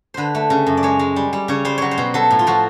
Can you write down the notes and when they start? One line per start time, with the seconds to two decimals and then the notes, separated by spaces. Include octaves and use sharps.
0.14 D3 B4 C5
0.35 A3
0.50 C#3
0.67 F#2
0.77 D5
0.83 G#3 C#5
0.99 G#3
1.16 G3
1.33 G3
1.48 C#3 C#5
1.65 G3 C5
1.78 F#3 C#5
1.91 C5
1.98 B2
2.14 F#3 A4
2.31 A2
2.39 F4
2.47 F3 F#4